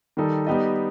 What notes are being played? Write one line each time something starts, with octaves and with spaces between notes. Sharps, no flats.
D#3 G3 D#4 A4
G3 B3 D#4 G4 D#5